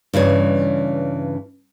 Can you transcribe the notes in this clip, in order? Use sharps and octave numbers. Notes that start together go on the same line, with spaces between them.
G2 C#3 E3 C#5